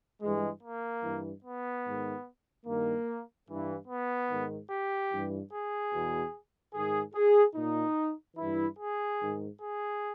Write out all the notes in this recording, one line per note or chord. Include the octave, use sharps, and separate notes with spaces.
G2 E3 G#3
A#3
G2 E3
B3
G#2 D#3
G2 D#3 A#3
G2 E3
B3
G#2 D#3
G4
G2 E3
G#4
E2 B2
G#2 D#3 G#4
G#4
A#2 D#4
G2 E3 E4
G#4
G#2 D#3
G#4